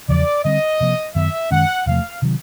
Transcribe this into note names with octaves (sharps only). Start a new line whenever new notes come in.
E2 C#3 F3 D5
D3 G3 C4 D#5
C3 F3 A#3
F#2 D#3 F#3 B3 E5
F#2 D#3 G#3 C#4 F#5
E2 C3 F3 A3 F5
C3 D#3 F#3